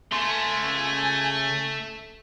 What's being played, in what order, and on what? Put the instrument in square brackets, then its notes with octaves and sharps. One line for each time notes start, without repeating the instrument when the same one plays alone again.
[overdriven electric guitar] C#3 C6 [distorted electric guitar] A3 [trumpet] G#5